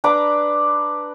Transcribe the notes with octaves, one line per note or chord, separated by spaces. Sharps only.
D4 B4 A#5 D6